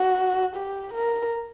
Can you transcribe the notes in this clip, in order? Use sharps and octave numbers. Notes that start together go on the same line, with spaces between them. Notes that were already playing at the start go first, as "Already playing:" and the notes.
Already playing: F#4
G4
A#4